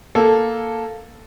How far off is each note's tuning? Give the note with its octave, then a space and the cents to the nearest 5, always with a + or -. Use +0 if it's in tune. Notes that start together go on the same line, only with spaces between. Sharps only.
A#3 +0 A4 +0